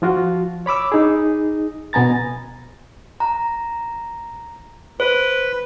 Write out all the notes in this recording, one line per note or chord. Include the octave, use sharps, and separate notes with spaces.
F3 F4 F#4
C#5 B5 D6 E6
D#4 G#4
B2 B3 G#5 A#5 A6
A#5
B4 C5